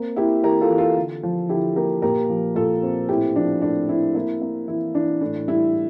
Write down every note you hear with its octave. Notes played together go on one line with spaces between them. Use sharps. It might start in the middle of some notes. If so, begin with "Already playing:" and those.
Already playing: A#3 C4
A#3 E4 G4
E3 G4 A#4
F4 A4
E3
F4 A4
D3
F3
D3 E4 G4
A#3 G4 A#4
A#2 G4 A#4
F3
A#2 F4 A4
C4
A2 E4 G4
F3 D4
A2 D4
C4 E4
A#3 E4
A#3
E3 E4
E3 D4
A2 D4
G3 E4
A2